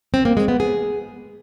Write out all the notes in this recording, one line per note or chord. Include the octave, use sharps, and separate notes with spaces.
C4
A#3
G#3
B3
G#4